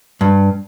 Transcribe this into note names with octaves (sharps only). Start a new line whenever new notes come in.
G2